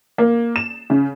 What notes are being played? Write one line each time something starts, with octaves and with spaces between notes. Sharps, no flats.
A#3
E7
C#3